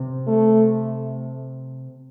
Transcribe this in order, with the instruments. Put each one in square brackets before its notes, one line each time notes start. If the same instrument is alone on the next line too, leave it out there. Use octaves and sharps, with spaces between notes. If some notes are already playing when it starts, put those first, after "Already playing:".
Already playing: [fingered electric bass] C3
[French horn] A3